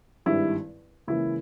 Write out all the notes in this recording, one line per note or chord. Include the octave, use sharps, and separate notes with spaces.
G#1 G2 D#3 G3 E4
C#2 C#3 E3 A#3 E4